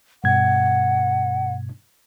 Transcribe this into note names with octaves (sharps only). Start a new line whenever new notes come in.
G2 B2 F#5 G#6